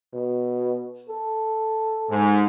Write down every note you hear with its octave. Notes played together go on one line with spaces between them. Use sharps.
B2
A4
G#2